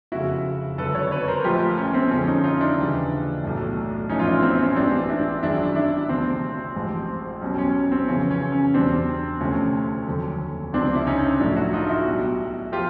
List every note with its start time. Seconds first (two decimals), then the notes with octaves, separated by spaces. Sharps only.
0.12 F1 F2 C#3 E4 F#4
0.78 G#1 F#2 D3 F#3 A4 B4
0.95 B4 C#5
1.11 B4 C#5
1.28 A#4 C5
1.44 A#1 A#2 F3 A3 F4 G4
1.78 C#4
1.94 C4
2.11 F2 D3 F3 G#3 C#4
2.27 C#4 D#4
2.44 D#4 F4
2.61 D4 E4
2.78 D#2 C#3 E3 G3
3.44 B1 A2 F#3 A3
4.09 A#1 A2 E3 C#4 D#4
4.19 F4
4.26 D4 E4
4.43 C4
4.59 C#4
4.76 A1 G#2 E3 G3 C4 D4
5.09 D4 E4
5.43 G#1 F#2 D#3 G#3 D4 E4
5.76 D4 E4
6.09 D2 C3 F3 C4
6.76 A1 G#2 F3
7.41 B1 B2 G3 C#4
7.58 C#4
7.92 C4
8.08 F2 C#3 E3 C#4
8.31 C#4
8.52 C#4
8.74 E2 B2 G3 C4 D4
9.40 D2 C3 F3 A3 C#4
10.07 F1 D#2 D3 F#3
10.73 C#2 C3 F3 C4 D4
10.96 E4
11.07 C#4 D#4
11.39 A#1 A2 F#3 A3 D4 E4
11.56 E4 F#4
11.73 D#4 F4
11.89 E4 F#4
12.05 B1 B2 G3
12.72 F3 F4 G4